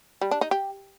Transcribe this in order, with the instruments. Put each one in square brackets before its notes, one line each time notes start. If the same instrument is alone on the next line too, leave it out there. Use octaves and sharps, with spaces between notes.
[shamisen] G3
D4
D#4
G4